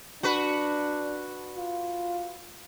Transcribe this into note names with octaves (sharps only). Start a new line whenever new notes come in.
D4 F#4 B4
F4